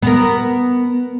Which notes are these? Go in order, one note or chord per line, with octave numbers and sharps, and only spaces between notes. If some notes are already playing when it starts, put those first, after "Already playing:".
B3 A#4